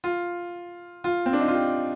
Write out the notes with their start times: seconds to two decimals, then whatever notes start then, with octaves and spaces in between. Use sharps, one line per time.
0.04 F4
1.04 F4
1.26 C4
1.33 D4
1.40 D#4
1.48 F4
1.54 G4